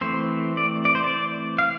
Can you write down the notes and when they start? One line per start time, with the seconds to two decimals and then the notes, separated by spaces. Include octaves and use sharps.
0.01 E3 A3 C4 C5
0.57 D5
0.85 D5
0.95 C5
1.04 D5
1.59 F5